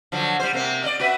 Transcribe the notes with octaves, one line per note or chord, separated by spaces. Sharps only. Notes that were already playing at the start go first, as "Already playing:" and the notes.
D3 F3 F#3
G3 C5
C3 A#3 C4
D5 D#5
F#4 B4 E5